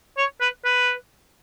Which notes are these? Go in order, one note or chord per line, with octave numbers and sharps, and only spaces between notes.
C#5
B4
B4